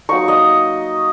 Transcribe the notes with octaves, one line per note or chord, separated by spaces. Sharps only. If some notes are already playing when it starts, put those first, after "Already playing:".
F#3 A#3 D#4 C#6
D#5